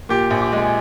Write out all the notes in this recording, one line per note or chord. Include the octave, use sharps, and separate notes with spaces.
A#2 G4
A#1
G4
G#3
G#4